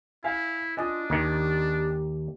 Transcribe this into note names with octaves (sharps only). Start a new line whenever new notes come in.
E4 E5 F5 G#5
D4 F4 D#5 G#5 D#6
D#2 D#3 G4